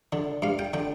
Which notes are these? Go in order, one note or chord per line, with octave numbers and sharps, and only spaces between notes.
D3
G2 F5
G5
D3 G5